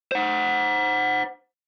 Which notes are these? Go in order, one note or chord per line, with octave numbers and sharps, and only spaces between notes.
C5 F#5